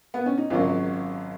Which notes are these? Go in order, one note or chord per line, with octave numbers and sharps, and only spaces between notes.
B3
C#4
D#4
G#1 F#2 C#3 F#3 F4